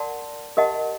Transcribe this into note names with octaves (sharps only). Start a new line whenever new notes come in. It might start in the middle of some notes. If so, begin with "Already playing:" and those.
Already playing: A#4 D5 F#5 A5 C6
G4 A#4 D#5 F#5 A5